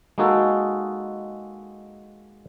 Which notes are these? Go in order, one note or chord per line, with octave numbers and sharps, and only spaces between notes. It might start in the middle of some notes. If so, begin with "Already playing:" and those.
G#3 A#3 D#4 F#4 G#4 A4